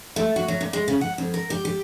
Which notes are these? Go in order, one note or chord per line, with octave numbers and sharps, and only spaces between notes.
A3
F#4
F#3
A#2
G#3
C#3
F#5
F2
A#4
G4
G4